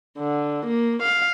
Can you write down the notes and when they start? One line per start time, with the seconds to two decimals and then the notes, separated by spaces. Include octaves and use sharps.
0.17 D3
0.65 A#3
1.01 F5